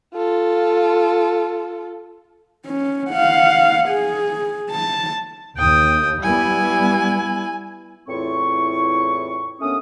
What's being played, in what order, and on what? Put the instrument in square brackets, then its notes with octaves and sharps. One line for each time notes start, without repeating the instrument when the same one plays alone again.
[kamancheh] F4 A4
[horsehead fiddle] C#4
F5 F#5
G#4
A5
[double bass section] D#2 [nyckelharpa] G5 D#6
[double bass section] G3 B3 [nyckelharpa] E4 [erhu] G#5
[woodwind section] E2 A2 C4 E4 F4 C#6
D#2 A3 B3 C#4 D4 D#6